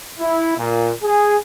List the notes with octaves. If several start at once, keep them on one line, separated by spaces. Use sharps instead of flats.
E4
A#2
G#4